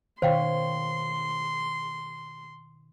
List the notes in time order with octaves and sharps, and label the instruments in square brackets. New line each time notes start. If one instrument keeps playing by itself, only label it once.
[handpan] B2 D#3 C#5 [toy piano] C5 F5 G5 [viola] C6